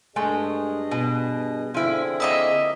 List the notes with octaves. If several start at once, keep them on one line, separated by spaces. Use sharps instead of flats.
G2 G#3 A3 G#4 D#5
B2
D3 F3 C4 E4 G#4
A#3 D#5 E5